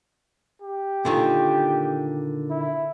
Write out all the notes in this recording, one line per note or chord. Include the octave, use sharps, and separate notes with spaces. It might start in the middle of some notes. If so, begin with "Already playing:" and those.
G4
A#2 D3 D#3
E4